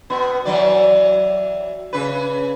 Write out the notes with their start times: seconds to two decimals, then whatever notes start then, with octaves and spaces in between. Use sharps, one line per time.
0.10 B2 B3
0.45 E3 F#3 D5
1.93 C#3 B4